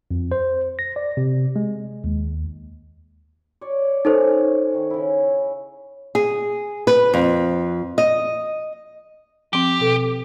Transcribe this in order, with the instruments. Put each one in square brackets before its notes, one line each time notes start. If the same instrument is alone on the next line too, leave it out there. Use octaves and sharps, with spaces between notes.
[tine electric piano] F2
C5
A#6
D5
C3
G#3
D#2
[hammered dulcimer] C#5 D5
[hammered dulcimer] C#4 C#5 [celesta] D#4 A4 C5
[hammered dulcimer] D#3
C#3 E4
[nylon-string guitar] G#4
B4
F2
D#5
[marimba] F3 C4 [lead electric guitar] G4
[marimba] B2 A4